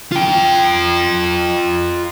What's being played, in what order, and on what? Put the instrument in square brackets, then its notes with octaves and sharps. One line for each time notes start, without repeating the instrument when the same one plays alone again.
[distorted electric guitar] F4 G5